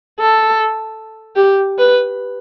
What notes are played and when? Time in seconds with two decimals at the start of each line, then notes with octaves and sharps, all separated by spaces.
0.20 A4
1.36 G4
1.79 B4